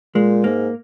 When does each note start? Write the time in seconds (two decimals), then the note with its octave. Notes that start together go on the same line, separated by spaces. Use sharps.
0.15 A#2 G#3
0.44 G#2 A#3